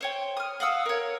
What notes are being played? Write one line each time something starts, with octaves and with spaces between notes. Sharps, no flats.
C5 C#5 G5
D#6 F6
F5 F#5 D#6 E6
A#4 C#5